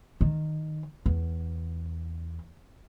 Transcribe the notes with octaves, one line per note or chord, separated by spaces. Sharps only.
D#3
E2